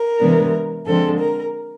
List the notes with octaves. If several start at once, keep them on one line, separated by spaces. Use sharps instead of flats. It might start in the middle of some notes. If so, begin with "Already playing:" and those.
Already playing: A#4
C3 E3 G#3 B3 D4
D3 F3 G#3 C4 A4
A#4